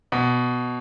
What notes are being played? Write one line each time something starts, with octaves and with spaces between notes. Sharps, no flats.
B2